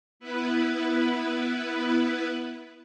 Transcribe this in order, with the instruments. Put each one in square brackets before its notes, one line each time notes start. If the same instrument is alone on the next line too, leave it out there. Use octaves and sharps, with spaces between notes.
[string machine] B3 E4 B4